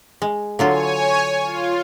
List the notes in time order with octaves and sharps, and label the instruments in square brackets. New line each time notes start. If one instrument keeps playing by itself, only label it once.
[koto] G#3
[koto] D3 F#3 F4 [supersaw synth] C#5 G#5
[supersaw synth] F4